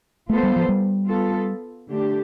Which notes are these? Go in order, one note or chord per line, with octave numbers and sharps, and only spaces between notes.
A3 B3 F4 A4 C5
G3
F3
G3
B3 F4 A4
D3 A3 D4 G4